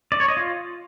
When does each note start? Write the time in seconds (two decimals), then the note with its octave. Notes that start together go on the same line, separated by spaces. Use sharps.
0.12 D5
0.20 C#5
0.28 D#5
0.37 F4